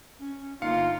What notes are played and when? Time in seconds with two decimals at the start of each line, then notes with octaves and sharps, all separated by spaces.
0.19 C#4
0.62 G1 A#3 D#4 F4 F5 C#7